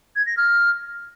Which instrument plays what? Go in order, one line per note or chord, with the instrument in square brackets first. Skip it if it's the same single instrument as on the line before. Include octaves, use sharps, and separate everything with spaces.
[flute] G#6
A#6
F6